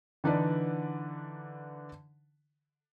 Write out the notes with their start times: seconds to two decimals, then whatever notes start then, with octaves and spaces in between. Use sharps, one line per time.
0.24 D3 E3 D4 D#4 B4 D5